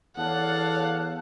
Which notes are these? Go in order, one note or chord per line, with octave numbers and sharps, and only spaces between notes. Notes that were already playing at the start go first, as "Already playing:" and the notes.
E2 A4 C#5 D5 F5 F#5 A5 F#6